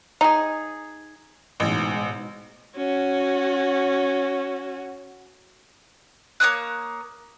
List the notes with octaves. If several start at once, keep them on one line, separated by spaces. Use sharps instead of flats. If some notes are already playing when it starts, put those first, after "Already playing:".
D#4 G#4
A1 G#2 B2
C#4 F#4
A#3 C#5 D#6 F#6